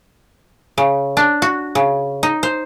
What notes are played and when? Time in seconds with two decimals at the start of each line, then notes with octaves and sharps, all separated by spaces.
0.78 C#3
1.17 D4
1.42 F#4
1.75 C#3
2.23 D#4
2.43 C5